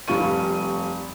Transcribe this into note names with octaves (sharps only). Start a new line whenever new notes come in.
F1 G3 F5 C#6 D#7